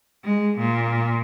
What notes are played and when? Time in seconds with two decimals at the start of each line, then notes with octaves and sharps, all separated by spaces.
0.25 G#3
0.59 A#2